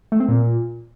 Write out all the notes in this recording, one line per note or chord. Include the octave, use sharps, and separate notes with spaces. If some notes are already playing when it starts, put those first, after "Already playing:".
A3
C4
A#2